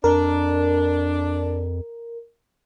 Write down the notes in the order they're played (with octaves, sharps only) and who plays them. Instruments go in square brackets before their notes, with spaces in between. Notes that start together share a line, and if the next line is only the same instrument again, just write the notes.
[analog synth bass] F2 [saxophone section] D4 [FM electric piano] A#4